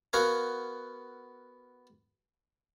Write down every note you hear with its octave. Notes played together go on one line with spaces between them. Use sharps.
B3 F#4 A#4 F5 G#5